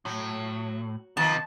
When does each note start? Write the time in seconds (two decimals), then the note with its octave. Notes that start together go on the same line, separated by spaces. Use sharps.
0.05 A2 F#3
1.17 C3 D#3 F3 A#3 B3 A5